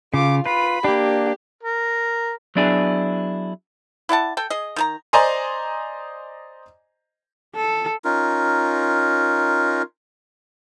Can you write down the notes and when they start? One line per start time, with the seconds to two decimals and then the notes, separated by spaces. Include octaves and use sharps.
0.14 C#3 F4 D6
0.46 F4 B4 B5
0.84 A#3 D4 G4
1.63 A#4
2.56 F#3 B3 D4 E4 G#4
4.09 E4 D5 F#5 A5
4.37 A4 G5
4.50 G#4 D#5
4.76 D#3 G#4 A#5
5.13 C5 D5 D#5 G#5 A#5 C6
7.55 A4
8.05 C#4 D#4 F4 A#4